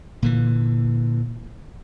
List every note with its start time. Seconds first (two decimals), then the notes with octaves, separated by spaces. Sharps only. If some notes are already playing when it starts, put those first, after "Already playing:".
0.22 A#2 D3 E3